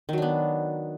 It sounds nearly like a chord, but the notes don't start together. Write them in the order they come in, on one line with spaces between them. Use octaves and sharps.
D#3 F#3 D4 B3